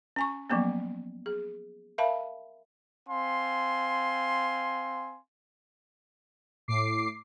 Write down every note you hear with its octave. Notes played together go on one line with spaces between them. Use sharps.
C#4 G#5 C#6
F3 F#3 A#3 B3 C#4
G#4
A#4 E5 F5 A5 B5
C4 F5 G#5 C6
A2 D6 C7